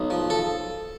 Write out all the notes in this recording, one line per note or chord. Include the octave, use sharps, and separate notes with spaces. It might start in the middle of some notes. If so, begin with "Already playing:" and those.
Already playing: B1
F3
A4